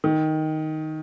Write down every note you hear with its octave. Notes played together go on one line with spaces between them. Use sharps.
D#3